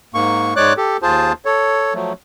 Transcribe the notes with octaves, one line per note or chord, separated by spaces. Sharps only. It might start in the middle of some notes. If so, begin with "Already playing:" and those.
G#2 A#3 C#6
G#2 G#3 C#5 D5 D6 F#6
G4 A4
D#2 F4 G#4 C5 A5
A4 C#5
F3 F#3 A3